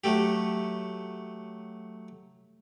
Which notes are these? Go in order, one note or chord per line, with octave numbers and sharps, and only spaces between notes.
F#3 A3 G4